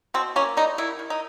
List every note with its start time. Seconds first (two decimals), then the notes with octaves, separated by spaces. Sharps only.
0.14 B2 C4
0.36 A#3 C#4
0.57 G3 D#4
0.78 D#3 E4
0.99 D#3
1.10 D#4